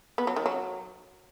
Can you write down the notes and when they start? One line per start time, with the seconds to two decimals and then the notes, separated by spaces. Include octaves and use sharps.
0.18 B3
0.27 F#3
0.36 D#3
0.46 F#3